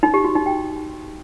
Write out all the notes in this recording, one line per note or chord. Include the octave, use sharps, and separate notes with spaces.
D#4
G4
F#4
D#4
G5